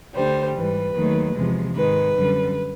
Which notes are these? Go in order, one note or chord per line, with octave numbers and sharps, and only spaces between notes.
D2 D3 G3 C5
G#2 E3 G3 B4
D#2 D#3 F#3 A3
E2 C3 F3 G#3
G#2 D#3 G#3 B4
F#2 D3 G3